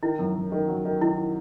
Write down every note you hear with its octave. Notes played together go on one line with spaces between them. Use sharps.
D#3 E4
F#2
F#2
D#3
F#3
D#3
D#3 E4